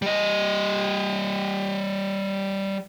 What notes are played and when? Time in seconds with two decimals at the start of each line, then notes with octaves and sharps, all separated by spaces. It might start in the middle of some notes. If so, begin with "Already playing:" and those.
0.02 G3 D#5